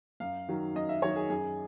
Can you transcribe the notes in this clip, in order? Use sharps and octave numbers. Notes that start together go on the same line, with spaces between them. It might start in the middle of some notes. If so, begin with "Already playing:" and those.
F#2 F5
D#3 F#3
F#2 D#5
E5
D#3 F#3 C#5
G#4
F#2 G#4